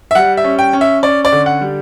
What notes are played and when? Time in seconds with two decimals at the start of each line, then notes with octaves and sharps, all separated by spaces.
0.11 E5
0.15 G3 F#5
0.37 E5
0.44 C#4
0.59 G5
0.73 C#4
0.81 E5
1.03 C#4 D5
1.25 D5
1.32 D3
1.46 F#5
1.61 G3